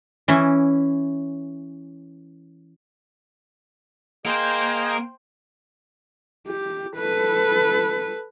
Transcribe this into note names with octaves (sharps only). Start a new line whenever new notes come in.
E3 C#4 E5
A#3 G#4 C5 D#5 G5
G4
A4 B4